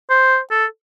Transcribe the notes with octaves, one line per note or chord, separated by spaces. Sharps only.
C5
A4